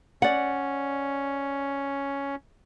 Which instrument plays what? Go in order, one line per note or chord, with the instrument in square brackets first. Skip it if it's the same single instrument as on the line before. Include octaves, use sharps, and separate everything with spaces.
[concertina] C#4 [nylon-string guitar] D5 F#5